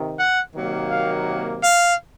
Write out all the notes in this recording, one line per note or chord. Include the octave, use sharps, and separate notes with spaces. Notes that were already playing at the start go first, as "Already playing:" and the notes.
Already playing: C3 D#3
F#5
C3 D#3 F#3 A#3
F5
F5